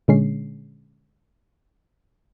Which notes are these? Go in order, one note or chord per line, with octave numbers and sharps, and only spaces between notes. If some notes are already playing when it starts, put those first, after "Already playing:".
A#2 D3 G#3 C#4 C7